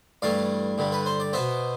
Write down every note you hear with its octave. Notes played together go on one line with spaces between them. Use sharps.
G2 E3 A3 D5 F5
G2 D3 G3
B4
C5
D5
B2 B3 C5 E5